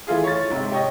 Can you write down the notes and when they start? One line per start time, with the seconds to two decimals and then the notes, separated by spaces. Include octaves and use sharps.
0.07 E3 A3 F4 G#4
0.24 C#5 A6
0.50 G#2 C3
0.71 G4 C#5 D#5